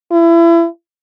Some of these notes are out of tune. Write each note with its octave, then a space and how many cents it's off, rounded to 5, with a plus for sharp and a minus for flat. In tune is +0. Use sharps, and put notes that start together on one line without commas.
E4 +30